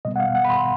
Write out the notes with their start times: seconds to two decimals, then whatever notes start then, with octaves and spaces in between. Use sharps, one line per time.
0.05 B2 G3 B3 D#5
0.16 F#5
0.20 F5
0.35 F#5
0.45 B5
0.50 C6